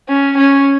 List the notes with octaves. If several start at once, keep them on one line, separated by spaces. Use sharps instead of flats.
C#4
C#4